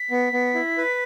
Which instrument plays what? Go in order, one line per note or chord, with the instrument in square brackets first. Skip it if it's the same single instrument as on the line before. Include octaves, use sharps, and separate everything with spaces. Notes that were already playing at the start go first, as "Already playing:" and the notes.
Already playing: [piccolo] B6
[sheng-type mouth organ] B3
B3
E4
B4